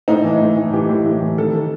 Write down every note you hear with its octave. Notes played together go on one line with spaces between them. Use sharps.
A2 D#4
E3
A2
E3
E3 G4
A2
A2
E3
D#3 A4
D#3